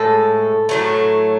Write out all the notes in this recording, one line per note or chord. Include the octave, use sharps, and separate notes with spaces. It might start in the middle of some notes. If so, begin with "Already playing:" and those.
Already playing: A2 G#3 A4
A2 F#3 A3